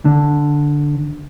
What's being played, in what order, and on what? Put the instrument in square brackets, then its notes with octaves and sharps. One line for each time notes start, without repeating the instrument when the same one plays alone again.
[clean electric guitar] D3